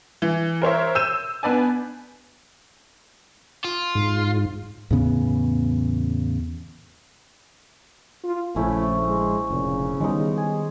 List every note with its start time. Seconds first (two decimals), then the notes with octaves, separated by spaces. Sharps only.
0.22 E3
0.62 A#4 C5 C#5 E5
0.95 E6 G6 D#7 E7
1.43 B3 D4 B4 D5 G#5
3.64 F4
3.95 G#2
4.91 E2 A2 C#3 B3
8.24 F4
8.56 A#1 C#3 A3 C#4 E4 C5
9.07 G#3
9.51 F1 A#2 C#3
10.00 D#3 G3 G#3 B3 D#4
10.37 G#4